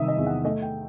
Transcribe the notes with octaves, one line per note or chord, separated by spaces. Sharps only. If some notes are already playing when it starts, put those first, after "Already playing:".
Already playing: C3 D#3 G3 E5 D#6 E6
D#5
E2
F#5
A3 D#5
G5